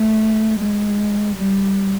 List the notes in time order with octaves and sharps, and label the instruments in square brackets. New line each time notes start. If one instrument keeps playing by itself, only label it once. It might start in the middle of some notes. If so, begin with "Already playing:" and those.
Already playing: [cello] A3
G#3
G3